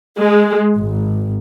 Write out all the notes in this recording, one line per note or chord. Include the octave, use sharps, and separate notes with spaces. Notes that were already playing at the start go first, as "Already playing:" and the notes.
G#3
G#1